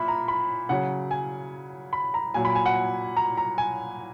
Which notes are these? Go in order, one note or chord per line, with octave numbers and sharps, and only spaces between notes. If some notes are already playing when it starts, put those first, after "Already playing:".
Already playing: A#2 E5 B5
A#5
B5
C#3 F#3 F#5
G#5
B5
A#5
A#2 F#3 G#5
B5
G#5
F#5
A#5
A#5
G#5